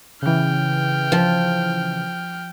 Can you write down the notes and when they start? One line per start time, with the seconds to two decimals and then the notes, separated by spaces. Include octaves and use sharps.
0.22 C#3 E3 G5 F6
1.12 F3